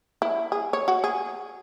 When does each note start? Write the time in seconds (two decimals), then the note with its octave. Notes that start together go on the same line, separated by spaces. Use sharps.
0.22 E4
0.52 G#4
0.73 C#5
0.88 F#4
1.04 G#4